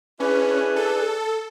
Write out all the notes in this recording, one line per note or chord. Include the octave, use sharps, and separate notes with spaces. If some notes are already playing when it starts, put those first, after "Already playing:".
C#4 D4 E4 G#4 B4
A4